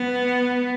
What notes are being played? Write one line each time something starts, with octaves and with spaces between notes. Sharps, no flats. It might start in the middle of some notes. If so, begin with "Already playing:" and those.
Already playing: B3